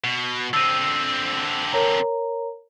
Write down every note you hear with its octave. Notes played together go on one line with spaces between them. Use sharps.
B2
D3 C4 E6 D#7
A#4 C#5 A#5